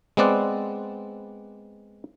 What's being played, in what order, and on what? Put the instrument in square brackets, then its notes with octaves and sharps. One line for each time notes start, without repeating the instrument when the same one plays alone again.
[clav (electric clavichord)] G#3 B3 C4 D5 F#5